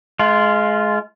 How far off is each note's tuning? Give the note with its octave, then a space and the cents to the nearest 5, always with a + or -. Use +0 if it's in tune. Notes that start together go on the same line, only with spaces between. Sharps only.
G#3 +30 F4 -10